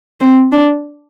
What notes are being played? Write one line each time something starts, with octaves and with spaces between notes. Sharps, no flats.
C4
D4